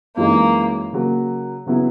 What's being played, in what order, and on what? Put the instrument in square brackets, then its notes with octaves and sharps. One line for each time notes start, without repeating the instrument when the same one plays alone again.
[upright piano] F#2 E3 G#3 D#4 [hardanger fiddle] A#3
[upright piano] C#3 F#3 A#3
C#3 F#3 B3 E4